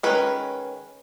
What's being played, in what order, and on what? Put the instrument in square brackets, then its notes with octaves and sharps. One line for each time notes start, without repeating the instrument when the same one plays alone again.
[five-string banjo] D#3 G#3 C#4 B4